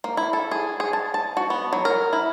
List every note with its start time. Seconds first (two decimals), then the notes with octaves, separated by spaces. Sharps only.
0.04 A#3
0.17 E4
0.33 A4
0.51 G#4
0.80 G#4
0.93 A5
1.14 A5
1.37 F#4
1.50 B3
1.73 F#3
1.85 A#4
2.13 E4